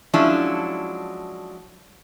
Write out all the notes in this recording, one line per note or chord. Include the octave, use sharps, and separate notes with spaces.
F3 F#3 G#3 C#4 D4 E4